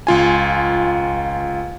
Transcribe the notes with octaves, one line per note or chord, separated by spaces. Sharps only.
C#2 F4 G#5